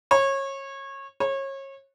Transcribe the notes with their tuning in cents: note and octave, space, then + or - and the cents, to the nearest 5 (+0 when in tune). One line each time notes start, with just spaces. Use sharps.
C#5 -25
C#5 -30